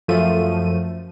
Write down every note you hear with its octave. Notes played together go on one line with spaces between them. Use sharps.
F#2 F3 A3 D#7